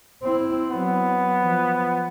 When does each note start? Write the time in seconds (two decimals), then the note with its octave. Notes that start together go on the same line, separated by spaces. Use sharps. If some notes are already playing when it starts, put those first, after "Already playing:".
0.23 C4 E4
0.71 F#3 B3
1.43 F3